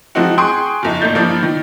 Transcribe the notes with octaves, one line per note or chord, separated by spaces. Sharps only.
E3 F3 G#3 C4 D#4 F#4
G#4 G5 C6 C#6 D#6 F#6
F#1 F2 D#4
G#1 A#2 A3 D#4 G6 A6
G2 E3 F3 A#3 D4
D#3